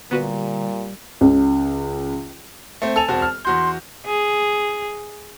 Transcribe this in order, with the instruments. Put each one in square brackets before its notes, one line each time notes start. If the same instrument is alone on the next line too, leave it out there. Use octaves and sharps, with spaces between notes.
[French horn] A#2 [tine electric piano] D3 A#5 [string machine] G3 [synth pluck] B3 F#4 B4
[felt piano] C#2 C#3
[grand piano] A3 C4
[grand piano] A4 G#5 F7 [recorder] A5
[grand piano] E1 C4 F#4
F6
[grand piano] E2 F#4 G6 [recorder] C6
[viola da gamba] G#4